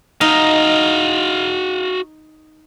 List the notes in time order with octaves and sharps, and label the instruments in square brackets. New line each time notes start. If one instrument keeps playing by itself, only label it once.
[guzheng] D#4 D#5 [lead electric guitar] F#4 F5